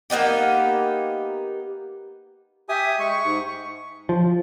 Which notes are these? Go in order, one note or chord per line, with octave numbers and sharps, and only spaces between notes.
A#3 B3 D#4 G4
G4 E5 G#5 D#6
G#3 C#6
G#2
F3